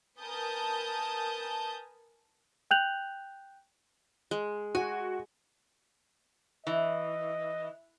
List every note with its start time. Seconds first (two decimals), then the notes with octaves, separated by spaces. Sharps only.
0.20 A#4 B4 G#5 A5 D#6 G6
2.71 G5 F#6 G6 F7 F#7
4.31 G#3
4.75 F#4 G#5
6.67 E3 D#5